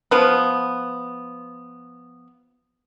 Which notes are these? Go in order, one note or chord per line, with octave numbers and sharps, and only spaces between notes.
F3 B3